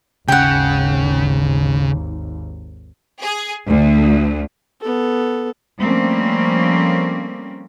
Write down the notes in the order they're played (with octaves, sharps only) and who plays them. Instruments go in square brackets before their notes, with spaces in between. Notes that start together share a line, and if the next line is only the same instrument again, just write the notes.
[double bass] G#1 D#2 [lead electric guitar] C#3 [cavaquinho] F#5 G5
[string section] G#4
D2
[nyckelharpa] B3 A4
[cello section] F3 G3 A3 A#3 C4 C#4